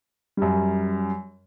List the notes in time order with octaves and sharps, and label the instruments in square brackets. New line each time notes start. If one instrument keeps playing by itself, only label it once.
[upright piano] F#2 G3